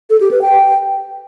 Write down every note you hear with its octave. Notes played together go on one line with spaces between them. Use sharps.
A4
G4
B4
G5